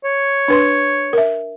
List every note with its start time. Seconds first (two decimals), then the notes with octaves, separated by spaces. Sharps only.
0.05 C#5
0.48 D4 B4 C6
1.13 A#4 E5